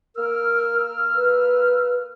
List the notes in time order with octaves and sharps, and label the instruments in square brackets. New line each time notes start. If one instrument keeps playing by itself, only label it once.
[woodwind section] A#3 E6 F6 [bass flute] A#4
[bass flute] B4